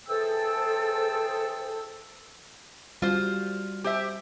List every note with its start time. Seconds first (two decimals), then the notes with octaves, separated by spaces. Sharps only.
0.08 E3 G#4 A4 C5 G5 E6
3.02 G3 F4 F#4 C5
3.84 G4 C5 E5